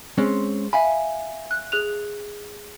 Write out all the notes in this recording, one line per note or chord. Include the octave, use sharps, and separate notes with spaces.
G#3 C4 C#4
E5 F5 G#5 B5
F#6
G#4 F#6 F7